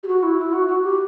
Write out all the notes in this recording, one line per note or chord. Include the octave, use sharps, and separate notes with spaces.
G4
F#4
E4
E4
F#4
F#4
G4